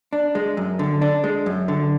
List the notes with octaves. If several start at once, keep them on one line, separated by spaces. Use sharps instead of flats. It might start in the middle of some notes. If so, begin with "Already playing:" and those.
D4
G#3
F#2
D3
D4
G#3
F#2
D3